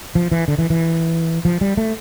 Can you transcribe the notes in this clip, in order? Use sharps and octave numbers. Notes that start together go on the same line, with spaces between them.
F3
E3
D3
E3
E3
F3
G3
A3